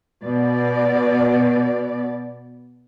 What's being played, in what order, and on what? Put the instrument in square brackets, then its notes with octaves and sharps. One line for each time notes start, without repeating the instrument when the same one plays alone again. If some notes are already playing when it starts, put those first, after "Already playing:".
[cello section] B2 D5